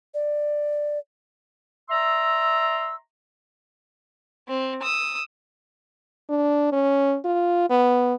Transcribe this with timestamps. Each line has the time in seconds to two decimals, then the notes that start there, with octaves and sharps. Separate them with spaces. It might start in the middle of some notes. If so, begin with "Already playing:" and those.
0.14 D5
1.90 D5 E5 A#5 C6 E6
4.48 C4
4.82 D#6 E6
6.29 D4
6.72 C#4
7.25 F4
7.70 B3